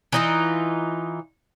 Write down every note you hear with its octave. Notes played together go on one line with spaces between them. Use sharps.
E3 D#4 F4